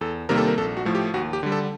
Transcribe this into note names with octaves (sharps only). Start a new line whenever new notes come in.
E2 A4
C3 D#3 G3 A#3 A#4
A4
A#4
A#1 A4
F#4
A2 F3 A3
G4
D#2 F#4
G4
D3 G3
A4